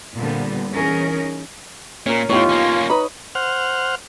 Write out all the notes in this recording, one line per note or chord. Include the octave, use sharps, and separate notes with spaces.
A#2 D3 G3 B3 C4
E3 C#4 D#4 G#4 A#4
A#2 C#4 A#4
E2 A2 D#4 F4 G4 C#5
A#3 C#4
D#4 B4 D#5 B5
C5 F#5 F6